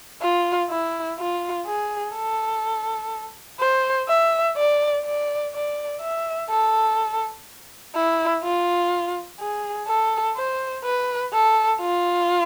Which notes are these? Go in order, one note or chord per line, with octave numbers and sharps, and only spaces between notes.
F4
E4
F4
G#4
A4
C5
E5
D5
D5
D5
E5
A4
E4
F4
G#4
A4
C5
B4
A4
F4